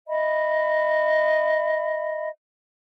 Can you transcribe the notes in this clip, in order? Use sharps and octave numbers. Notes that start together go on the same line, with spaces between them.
D#5 E5 B5